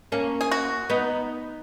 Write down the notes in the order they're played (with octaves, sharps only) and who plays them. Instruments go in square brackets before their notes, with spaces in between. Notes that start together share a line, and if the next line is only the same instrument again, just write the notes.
[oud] A#3 C#4
[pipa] G#4
F#4
[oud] B3 D#4